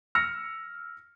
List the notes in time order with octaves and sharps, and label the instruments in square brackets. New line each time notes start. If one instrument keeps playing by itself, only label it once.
[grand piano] E6 F6 A#6 C#7